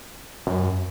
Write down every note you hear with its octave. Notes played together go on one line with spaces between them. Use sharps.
F#2